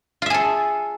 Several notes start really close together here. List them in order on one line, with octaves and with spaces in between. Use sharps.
F4 E5 G#4 A4